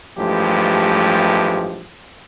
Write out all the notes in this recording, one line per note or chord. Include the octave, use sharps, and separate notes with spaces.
A1 G2 F3 G#3 A3 G4